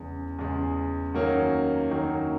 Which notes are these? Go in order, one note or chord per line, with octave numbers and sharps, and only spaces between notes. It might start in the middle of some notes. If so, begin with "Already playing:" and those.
Already playing: E2 C#3 G#3
E2 C#3 G#3
F#2 D#3 A#3 C#4 F#4
F#2 D#3 A#3 C#4 F#4